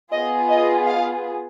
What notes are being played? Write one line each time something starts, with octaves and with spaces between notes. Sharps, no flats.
B3 F4 G#4 D#5
D#5
F5